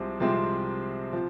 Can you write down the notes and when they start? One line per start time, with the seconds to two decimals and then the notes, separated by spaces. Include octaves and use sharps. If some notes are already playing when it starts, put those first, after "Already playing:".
Already playing: C2 C3 F3 G#3 C4
0.20 C2 C3 F3 G#3 C4
1.13 F3